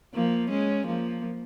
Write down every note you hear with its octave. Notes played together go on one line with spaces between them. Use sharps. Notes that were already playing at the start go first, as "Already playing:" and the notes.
F3 A#3
G#3 C#4
F3 A#3